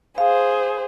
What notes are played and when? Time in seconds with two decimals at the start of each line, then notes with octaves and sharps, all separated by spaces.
0.18 G#4 C5 F5